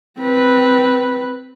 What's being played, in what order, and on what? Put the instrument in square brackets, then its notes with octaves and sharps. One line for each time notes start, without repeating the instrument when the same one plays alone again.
[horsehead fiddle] C4 B4